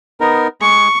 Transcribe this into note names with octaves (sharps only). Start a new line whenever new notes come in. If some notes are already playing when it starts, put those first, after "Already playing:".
B3 D#4 A#4
G#3 G#4 C#6